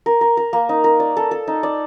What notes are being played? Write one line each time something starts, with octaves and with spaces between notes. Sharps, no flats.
A#4
A#4
A#4
A#3
D#4
A#4
D5
A4
A4
D#4
D5